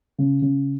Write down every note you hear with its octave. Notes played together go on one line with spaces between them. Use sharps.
C#3
C#3